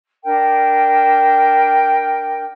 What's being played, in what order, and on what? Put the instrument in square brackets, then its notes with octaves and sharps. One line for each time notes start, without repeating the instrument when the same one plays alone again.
[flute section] D4 A#4 G5